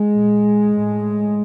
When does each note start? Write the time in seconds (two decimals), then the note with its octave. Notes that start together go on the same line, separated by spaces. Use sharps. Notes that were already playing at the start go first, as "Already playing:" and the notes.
Already playing: G#3
0.14 A#2
0.74 A2